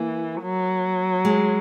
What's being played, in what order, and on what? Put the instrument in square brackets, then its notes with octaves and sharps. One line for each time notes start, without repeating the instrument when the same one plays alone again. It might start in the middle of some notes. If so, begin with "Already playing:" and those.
Already playing: [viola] E3 [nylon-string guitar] A#3
[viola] F#3
[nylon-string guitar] G#3